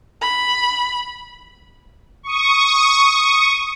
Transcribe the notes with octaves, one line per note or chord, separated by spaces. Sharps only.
B5
C#6 D#6